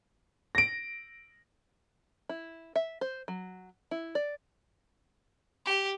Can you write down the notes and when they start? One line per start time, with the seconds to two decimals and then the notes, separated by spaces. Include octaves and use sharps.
0.55 A#6 D7
2.29 E4
2.76 E5
3.01 C5
3.28 F#3
3.91 E4
4.15 D5
5.65 G4